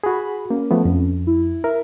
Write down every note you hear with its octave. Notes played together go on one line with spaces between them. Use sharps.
F#4 G#4 B5
A#3 C#4
F3 A3 B3
F2
E4
A#4 E5